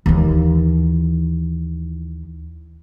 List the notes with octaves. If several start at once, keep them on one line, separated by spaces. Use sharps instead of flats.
D#2 E3